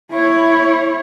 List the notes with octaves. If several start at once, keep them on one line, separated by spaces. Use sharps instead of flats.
E4 C#5